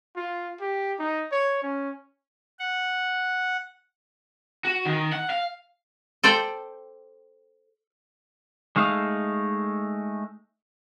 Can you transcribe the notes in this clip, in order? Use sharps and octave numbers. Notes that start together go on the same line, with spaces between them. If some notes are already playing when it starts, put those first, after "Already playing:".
F4
G4
D#4
C#5
C#4
F#5
F#4
D#3
F#5
F5
A4 C5 D5 G5
G#3 A3 D#4 F5